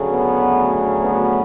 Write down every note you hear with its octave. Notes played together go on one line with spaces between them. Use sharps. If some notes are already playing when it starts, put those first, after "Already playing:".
Already playing: D2 C#3 F#3 A3
B3
B3